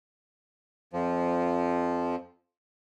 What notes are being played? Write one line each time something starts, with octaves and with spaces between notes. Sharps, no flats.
F2 F3